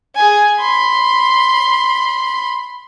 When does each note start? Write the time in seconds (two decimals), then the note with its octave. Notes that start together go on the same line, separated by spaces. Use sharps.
0.15 G#4 G#5
0.60 B5 C6